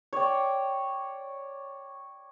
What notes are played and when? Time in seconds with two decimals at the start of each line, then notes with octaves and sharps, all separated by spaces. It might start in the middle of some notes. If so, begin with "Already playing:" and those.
0.13 C#5 D5 G5